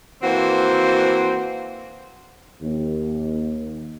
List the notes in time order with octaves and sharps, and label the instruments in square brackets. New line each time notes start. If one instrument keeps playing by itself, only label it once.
[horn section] E3 A#3 C4 F#4 C5
[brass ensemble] D#2